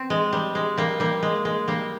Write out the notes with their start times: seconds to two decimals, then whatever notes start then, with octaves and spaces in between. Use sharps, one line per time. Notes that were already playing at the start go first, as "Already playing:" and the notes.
Already playing: C4
0.10 G#3
0.33 G3
0.55 G#3
0.78 G3 A#3
1.00 G3 A#3
1.23 G#3
1.45 G#3
1.68 G3 A#3